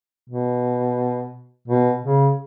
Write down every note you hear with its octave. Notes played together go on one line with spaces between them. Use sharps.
B2
B2
C#3